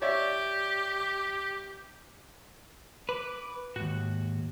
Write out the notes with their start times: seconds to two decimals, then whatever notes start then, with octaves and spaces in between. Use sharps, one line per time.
0.02 G4 C#5 D5 E5
3.09 B4 D6
3.76 D#2 G#2 F#4